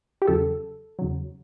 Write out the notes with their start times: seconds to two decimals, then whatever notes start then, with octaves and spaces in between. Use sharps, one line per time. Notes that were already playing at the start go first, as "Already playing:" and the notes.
0.22 G4
0.27 E2 C#3 F#3 A4
0.99 E2 C#3 F#3